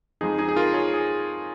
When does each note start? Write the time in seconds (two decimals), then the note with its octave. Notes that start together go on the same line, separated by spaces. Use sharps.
0.21 F2 F3 G#3 D#4 G#4
0.38 D#4 G#4
0.49 G#4
0.56 F4 A#4
0.74 G#4 C#5
0.94 G#4